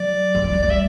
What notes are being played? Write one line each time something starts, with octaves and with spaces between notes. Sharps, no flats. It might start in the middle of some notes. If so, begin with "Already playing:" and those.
Already playing: F#3 D5
D3
E3
F#3
G3 D5
E5